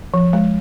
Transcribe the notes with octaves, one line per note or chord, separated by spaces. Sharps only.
F3
G#3